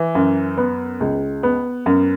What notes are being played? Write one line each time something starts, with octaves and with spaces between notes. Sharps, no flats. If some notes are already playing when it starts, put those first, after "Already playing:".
Already playing: E3
F#2
B3
C#2
B3
F#2